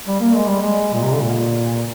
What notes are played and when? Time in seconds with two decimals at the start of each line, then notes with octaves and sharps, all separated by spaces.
0.06 G3
0.20 A#3
0.35 G#3
0.48 G3
0.61 G#3
0.93 A#2
1.03 C3
1.13 D3
1.23 A#2